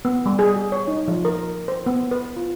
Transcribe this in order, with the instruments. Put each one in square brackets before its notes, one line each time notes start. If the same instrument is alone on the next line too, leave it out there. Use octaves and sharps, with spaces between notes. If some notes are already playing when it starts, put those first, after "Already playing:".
[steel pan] B3
G3
G#4
G4
C#5
D#4
F3
A#4
C5
B3
B4
F4